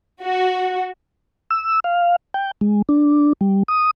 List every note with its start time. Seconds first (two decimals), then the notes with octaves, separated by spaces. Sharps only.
0.23 F#4
1.50 E6
1.84 F5
2.34 G5
2.61 G#3
2.89 D4
3.41 G3
3.68 D#6